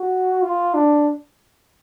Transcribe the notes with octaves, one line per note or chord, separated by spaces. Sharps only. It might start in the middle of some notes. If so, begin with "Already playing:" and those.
Already playing: F#4
F4
D4